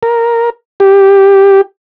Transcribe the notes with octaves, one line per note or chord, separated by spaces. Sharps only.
A#4
G4